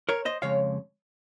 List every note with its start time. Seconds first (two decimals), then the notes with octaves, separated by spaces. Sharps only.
0.09 A#4 C#5
0.25 C5 D#5
0.42 F2 C#3 G#3 C#5 F5